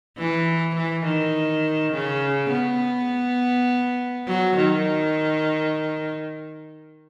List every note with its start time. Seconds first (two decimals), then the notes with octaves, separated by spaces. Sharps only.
0.18 E3
0.75 E3
1.05 D#3
1.93 C#3
2.52 B3
4.27 F#3
4.56 D#3